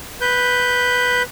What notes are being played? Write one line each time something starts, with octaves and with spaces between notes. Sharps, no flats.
B4 G6